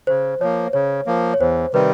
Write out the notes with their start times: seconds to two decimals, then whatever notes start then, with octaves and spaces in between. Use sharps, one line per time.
0.07 C#3 C5
0.40 F3 A#3 C#5
0.73 C#3 C#5
1.07 F3 A#3
1.34 C#5
1.40 E2 C5
1.73 C3 D#3 G3 B4